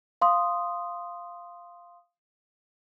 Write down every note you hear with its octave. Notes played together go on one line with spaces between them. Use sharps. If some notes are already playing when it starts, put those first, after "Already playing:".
F5 C6 D#6